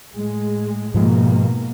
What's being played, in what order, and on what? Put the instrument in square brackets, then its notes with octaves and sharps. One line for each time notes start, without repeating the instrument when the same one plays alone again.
[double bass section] A2 G#3
[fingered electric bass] G#2 F3 G#3 [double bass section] B2 A#3